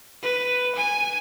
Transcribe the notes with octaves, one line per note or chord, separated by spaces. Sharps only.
B4
G#5